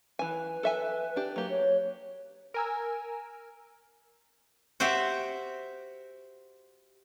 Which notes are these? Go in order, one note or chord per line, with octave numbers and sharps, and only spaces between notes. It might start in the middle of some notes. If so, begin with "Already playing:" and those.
E3 B4 G#5
A4 E5 G#5
D4 G4
F#3 A#3 G4
C#5
A#4 G#5 E6
F#4 G4 C5 E5